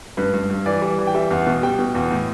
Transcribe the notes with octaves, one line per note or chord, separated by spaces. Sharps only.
G2 B4
G2
G2
E3 D5
G3
E3
G5
G3 E5
E2
B2
G3 G5
B2
E2
A2